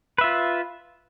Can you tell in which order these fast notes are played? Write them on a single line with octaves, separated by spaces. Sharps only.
B4 E5 F4